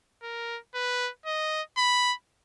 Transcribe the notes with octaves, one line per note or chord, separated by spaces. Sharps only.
A#4
B4
D#5
B5